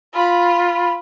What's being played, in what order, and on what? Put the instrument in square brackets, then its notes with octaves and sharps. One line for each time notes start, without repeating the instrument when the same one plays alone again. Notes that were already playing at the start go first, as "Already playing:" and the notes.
[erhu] F4 [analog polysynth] B5